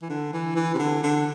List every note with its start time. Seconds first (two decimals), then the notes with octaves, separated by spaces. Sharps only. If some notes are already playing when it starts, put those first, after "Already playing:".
0.02 E3
0.10 D3
0.33 E3
0.56 E3
0.75 C3
0.79 D3
1.03 D3